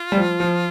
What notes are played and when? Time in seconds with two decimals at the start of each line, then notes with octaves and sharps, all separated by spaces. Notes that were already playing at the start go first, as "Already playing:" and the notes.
Already playing: F4
0.12 G3
0.17 F3
0.40 F3